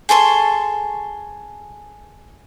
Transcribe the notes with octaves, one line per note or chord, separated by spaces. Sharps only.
G#4 A4 C6 C#6